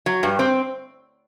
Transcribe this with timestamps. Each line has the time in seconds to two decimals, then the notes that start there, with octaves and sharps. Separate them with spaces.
0.06 F#3
0.23 G2
0.39 C4